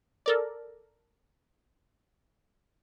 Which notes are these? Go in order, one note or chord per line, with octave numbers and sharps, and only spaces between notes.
A4 A#4 D5